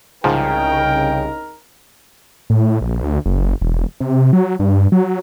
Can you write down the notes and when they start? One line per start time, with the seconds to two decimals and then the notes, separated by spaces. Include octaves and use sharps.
0.24 C2 G#2 C#3 F3 D#4 A#4 G5
2.50 A2
2.81 A#1
3.03 D2
3.26 F#1
3.61 E1
4.01 C3
4.33 F#3
4.59 G2
4.92 F#3